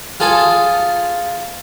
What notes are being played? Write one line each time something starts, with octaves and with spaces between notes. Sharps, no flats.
F4 G#4 A4